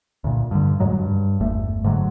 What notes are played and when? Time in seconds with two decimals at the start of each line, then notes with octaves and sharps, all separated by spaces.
0.24 D2 A#2
0.51 G2 D3
0.80 F2 G#2 F#3 G#3
0.99 G2
1.40 G1 E2 A3
1.84 G#2 D3 F3 F#3